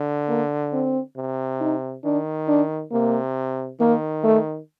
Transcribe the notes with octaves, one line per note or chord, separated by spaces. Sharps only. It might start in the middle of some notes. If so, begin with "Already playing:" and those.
Already playing: D3
A#3
C4
C3
D#4
D#3 D4
D4
C3 A#3
D#3 A#3
A3